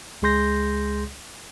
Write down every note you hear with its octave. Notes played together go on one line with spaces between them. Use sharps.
C#2 G#3 G#4 C6 G6 A#6